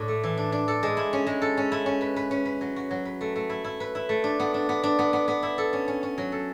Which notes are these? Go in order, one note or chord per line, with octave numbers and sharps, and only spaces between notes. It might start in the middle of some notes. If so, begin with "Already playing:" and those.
Already playing: A2 D4
A3
E3
D4
D4
A4
G#3
E4
C#4
G#3
A4
C#4
E4
C#4
B4
B4
C#4
B4
F#3
F#4
F#3
B4
A3
A3
E4
E4
B4
E4
A3
D4
B3
D4
B3
D4
B3
B3
B3
E4
A4
C#4
C#4
C#4
F#3
A4